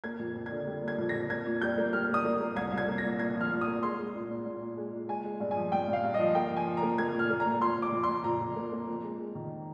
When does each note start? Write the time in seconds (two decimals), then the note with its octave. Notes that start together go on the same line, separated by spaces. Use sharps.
0.04 A#3 G#6
0.20 F2
0.36 F2
0.46 D3 G#6
0.67 G3
0.83 A#3 G#6
0.98 F2
1.09 A#6
1.15 F2
1.30 A#3 G#6
1.46 A#2
1.61 G3 G6
1.78 A#3
1.93 G3 F6
2.09 G3 D#6
2.25 A#3
2.40 A#3
2.56 C2 G#6
2.72 C2
2.78 G#6
2.88 A#3
2.98 A#6
3.04 A#2
3.19 A#2 G#6
3.35 F3
3.41 F6
3.51 A#2
3.61 D#6
3.67 A#3
3.83 G#3 C6
3.98 G#3
4.15 A#2
4.30 A#2
4.45 A#2
4.62 A#2
4.77 G#3
4.93 A#2
5.09 G#3 G#5
5.24 G#3
5.40 G2
5.51 F3 G#5
5.72 G2 G5
5.88 G2
5.93 F5
6.04 G2
6.14 D#5
6.19 F3
6.35 A#3 G5
6.51 F3
6.56 G#5
6.66 F3
6.77 A#5
6.83 A#3
6.98 A#3 G#6
7.14 A#2
7.19 F6
7.30 A#3
7.40 A#5
7.46 A#2
7.62 F2 C6
7.77 F2
7.82 D6
7.92 F2
8.03 C6
8.09 F2
8.24 F2 A#5
8.41 F2
8.56 A#3
8.72 A#3
8.87 F2
9.03 G#3
9.19 G#3
9.35 D#3